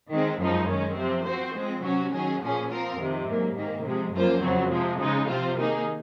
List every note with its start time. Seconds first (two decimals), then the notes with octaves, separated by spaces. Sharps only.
0.11 D#3 G#3 C4
0.39 F#2 F3 G#3 D#4
0.68 D#3 G#3 C#4
0.97 C3 F3 C4
1.26 F3 C4 F#4 C5
1.55 F3 G#3 C4
1.83 C3 F#3 C#4 F#4
2.12 D#3 F#3 C#4 G#4
2.40 A#2 F3 A#3 C#4 G#4
2.70 F3 C4 F4 A#4
2.98 F2 C3 D#3
3.27 G#2 F#3 A#3
3.56 G#2 D#3 A#3
3.84 C3 F3 G#3
4.14 F#2 F3 A#3 F4 C5
4.42 F2 C#3 F#3 C4
4.71 C3 F3 G#3
4.99 C#3 G#3 D#4
5.28 C3 F3 C4 F4 C5
5.57 D#3 A#3 D#4 G#4